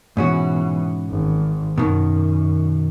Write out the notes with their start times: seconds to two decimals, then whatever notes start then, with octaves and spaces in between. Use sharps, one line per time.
0.17 G#2 B2 E3 C#4 F#4
1.10 G#1
1.78 F#2 B2 D#3